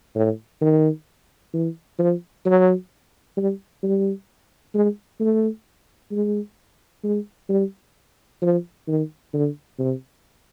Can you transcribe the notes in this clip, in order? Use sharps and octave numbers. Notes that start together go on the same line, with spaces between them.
A2
D#3
E3
F3
F#3
G3
G3
G#3
A3
G#3
G#3
G3
F3
D#3
D3
C3